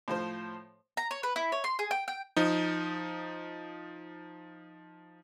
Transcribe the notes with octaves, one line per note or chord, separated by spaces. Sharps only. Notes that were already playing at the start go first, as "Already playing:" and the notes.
A2 F3 C5
A#5
C#5
B4
E4
C#5
C6
G#4
G5
G5
F3 D#4